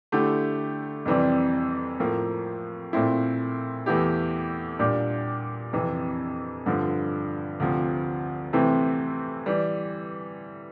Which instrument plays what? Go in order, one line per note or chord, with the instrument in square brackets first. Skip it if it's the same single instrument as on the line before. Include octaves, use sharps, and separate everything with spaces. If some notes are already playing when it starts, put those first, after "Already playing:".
[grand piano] D3 A3 E4 G4
F2 C3 E3 G3 C4
A2 F3 A#3
A#2 A3 C4 E4
E2 E3 A3 E4 G4
A#2 G3 D4 G4
F2 C3 E3
G2 D3 F3
D2 C3 F3
C3 E3 A3 C4 E4
E3 G3